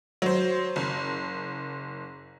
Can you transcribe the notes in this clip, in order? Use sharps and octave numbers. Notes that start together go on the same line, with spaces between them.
F#3 C5
F#1